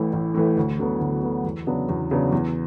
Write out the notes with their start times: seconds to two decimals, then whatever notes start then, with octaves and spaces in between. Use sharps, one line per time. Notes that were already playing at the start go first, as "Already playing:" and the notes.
Already playing: A1 A2 E3 A3
0.13 A1
0.34 A2 E3 A3
0.57 D2
0.79 D3 F#3 B3
1.01 D2
1.23 D3 F#3 B3
1.44 E2
1.67 C#3 F#3 B3 D4
1.89 E2
2.11 C#3 F#3 B3 D4
2.32 E2